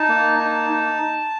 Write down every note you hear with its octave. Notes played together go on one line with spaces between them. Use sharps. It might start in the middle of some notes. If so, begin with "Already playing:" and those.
Already playing: D#4 A5
A#3
D#4
D#4